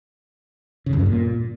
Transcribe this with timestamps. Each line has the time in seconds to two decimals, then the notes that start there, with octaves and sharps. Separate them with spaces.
0.86 C#3
0.93 F2
0.99 G2
1.06 A#2